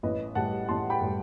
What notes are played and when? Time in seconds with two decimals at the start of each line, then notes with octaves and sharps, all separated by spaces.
0.03 A1 B4 D#5
0.35 A2 G3 F#5 A5
0.68 A1 A5 C6
0.90 G5 B5
1.01 A2 G3